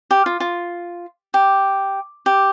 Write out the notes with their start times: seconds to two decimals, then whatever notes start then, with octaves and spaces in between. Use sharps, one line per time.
0.11 G4
0.26 F4
0.40 F4
1.34 G4
2.26 G4